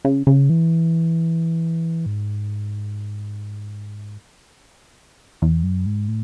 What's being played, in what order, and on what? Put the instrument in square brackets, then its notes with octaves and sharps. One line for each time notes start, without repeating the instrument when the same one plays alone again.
[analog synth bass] C#3
C#3
E3
G#2
E2
F#2
G#2
A2